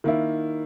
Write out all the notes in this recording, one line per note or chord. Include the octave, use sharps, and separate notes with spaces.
D#3 A#3 E4